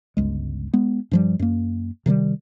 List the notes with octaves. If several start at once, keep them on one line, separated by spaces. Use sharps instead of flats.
G1 C#2 G#3
G#3 B3
G2 F3 G3
F#2 A#3
C3 D#3 F#3 G3